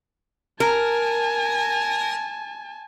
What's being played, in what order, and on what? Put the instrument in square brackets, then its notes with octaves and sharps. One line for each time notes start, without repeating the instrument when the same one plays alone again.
[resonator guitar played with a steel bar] A#4 [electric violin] G#5 A5